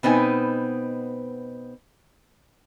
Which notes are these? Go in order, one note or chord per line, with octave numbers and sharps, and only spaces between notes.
B2 B3 C4 D#4 G#5